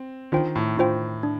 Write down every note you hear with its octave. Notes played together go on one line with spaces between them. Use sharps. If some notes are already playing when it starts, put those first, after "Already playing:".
Already playing: C4
D#3 D4 F4 C5 G5
A2
A2 D4 F4 C5 G5
D4